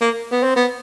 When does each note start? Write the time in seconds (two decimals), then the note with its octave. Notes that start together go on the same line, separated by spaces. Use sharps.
0.01 A#3
0.31 B3
0.43 C4
0.56 B3